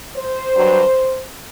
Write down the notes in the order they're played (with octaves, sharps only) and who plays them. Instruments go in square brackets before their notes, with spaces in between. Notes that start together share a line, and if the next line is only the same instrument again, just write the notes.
[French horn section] C5
G2 F#3